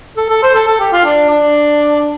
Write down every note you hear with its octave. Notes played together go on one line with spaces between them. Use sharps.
A4
A4
C5
A4
A4
G4
F4
D4
D4